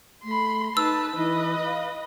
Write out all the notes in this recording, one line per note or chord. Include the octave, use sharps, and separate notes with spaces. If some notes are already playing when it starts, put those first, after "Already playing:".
A3 B5 C6
D#4 B4 A5 E6
E3 B4 D#5
F5